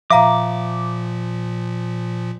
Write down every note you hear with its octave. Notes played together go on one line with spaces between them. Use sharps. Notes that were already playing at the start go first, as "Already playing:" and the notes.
A#2 F3 E5 F5 A#5 D6